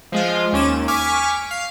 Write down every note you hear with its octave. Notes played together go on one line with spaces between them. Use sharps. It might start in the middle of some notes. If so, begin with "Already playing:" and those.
F3 G#3 F4
D#2 C#4 D6 E7
D#2
G#5 C#6 D6 F6 B6
F5